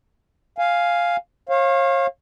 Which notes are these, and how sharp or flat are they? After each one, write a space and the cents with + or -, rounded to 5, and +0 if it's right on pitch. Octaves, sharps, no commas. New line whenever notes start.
F5 +0 G#5 +0
C#5 -40 F5 +0